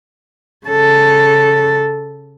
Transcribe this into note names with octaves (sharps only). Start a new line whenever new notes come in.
C#3 A4